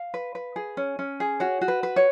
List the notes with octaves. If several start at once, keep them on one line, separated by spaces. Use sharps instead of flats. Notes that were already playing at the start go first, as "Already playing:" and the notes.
Already playing: F5
B4
B4
G#4
C#4
C#4
G#4
F#4 C#5
F#4
B4
B4
C#5